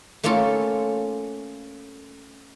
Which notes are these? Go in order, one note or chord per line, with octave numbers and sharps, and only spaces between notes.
A3 A#3 C#4 F4 A4